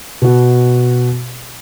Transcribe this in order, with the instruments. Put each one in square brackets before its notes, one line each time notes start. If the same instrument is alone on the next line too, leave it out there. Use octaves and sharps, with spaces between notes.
[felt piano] B2 F#4